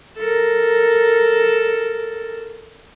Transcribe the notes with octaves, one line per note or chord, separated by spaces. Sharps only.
A4 A#4